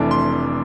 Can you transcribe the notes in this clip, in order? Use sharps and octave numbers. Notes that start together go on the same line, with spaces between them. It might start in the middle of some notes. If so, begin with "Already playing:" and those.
Already playing: F1 F2 E3 A3 D4 D6
C6